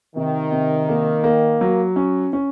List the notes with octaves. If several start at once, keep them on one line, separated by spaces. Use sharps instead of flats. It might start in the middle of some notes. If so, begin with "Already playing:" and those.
C3 D#3
C3
A#3
A#3
F#3
C#4
C#4